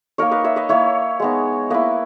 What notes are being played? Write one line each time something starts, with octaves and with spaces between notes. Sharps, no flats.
A#3 D#4 A#4 C#5
B4 D#5
C#5 E5
B4 D#5
A#3 E4 C#5 E5
G#3 B3 D#4
A#3 E4 B4 D#5